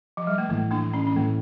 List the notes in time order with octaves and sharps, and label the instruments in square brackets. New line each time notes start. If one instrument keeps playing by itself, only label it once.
[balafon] F3
G3
A3
[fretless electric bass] A2 E3 A3 [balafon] A#3
[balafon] A#3 D4
C#4
C#4
[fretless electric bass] A2 E3 A3 [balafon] A#3